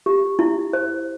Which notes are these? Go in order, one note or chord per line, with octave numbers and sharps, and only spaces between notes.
G4
E4
C5